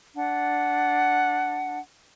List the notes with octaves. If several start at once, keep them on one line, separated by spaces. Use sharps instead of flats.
D4 F#5